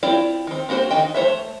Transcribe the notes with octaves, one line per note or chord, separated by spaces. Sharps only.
C4 E4 F4 G4 D5
D#3 C4
A#3 C4 F#4 B4 C5
D#3 F#4 D#5 G5
A3 C5 C#5 E5